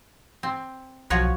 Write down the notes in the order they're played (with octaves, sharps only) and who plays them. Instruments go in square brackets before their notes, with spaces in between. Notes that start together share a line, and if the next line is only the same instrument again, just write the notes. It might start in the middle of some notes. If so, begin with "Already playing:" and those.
[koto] C4
[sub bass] B1 [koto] F3 F#4 C#5